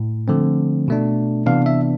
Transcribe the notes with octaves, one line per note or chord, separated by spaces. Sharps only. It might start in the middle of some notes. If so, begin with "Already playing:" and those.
Already playing: A2
D3 F3 A3 C4
B2 A3 D4
C3 E3 B3 D4 F5
E5